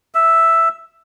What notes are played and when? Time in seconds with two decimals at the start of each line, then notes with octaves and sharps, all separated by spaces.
0.15 E5